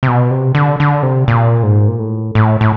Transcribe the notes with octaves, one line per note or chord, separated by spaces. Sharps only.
C3
B2
C3
D3
D3
C3
A#2
G#2
A#2
A2
A2
A2